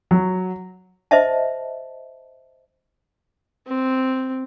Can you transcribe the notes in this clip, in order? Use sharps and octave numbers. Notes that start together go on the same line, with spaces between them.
F#3
C5 D#5 E5 A5
C4